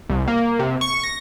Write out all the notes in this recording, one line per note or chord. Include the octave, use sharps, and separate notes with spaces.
C2
A#3
C3
C#6
A#6